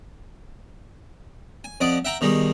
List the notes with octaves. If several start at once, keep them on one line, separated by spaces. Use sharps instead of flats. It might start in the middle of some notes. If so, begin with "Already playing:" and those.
G#5
F2 D5 D#5 F#5 D6
E5 F#5 G5 A#5
B2 D#3 G3 G#3